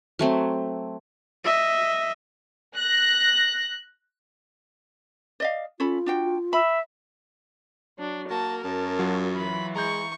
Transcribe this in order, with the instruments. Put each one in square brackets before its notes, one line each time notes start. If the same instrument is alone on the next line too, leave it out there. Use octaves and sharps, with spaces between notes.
[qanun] F#3 A3 C4
[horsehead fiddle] D#5 E5
[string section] F#6 A#6
[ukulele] D5 D#5 F5
[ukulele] C#4 A4 B5 [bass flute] F4
[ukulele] D4 F#4 G5
[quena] E5 [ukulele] B5
[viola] F#3 D4
[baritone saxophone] A#3 [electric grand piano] F#4 [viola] A#4 [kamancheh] A5
[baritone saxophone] F#2 [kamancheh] A5
[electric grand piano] F#3 F4 F#4
[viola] E3 [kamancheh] B5
[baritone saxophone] G#3 [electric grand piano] A#5 G6 [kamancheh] C#6